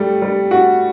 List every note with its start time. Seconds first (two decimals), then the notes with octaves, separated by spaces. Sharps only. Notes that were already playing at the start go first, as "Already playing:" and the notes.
Already playing: G3 A3
0.22 G3
0.51 F#4